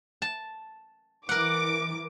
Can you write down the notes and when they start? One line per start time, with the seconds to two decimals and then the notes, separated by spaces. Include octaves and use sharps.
0.22 A5
1.29 E3 A#4 F#5 D6